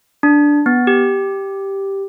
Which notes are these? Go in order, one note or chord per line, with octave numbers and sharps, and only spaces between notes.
D4
B3
G4